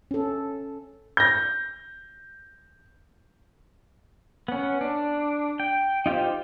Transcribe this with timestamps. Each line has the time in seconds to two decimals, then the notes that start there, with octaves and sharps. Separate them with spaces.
0.11 C#4 A4
1.17 G6 A#6
4.48 B3 C#4
4.81 D4
5.60 G5
6.06 D#4 F4 G4 C5